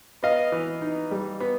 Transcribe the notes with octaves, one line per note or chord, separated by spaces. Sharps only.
B3 D#5 F5
E3
D#4
G3
B3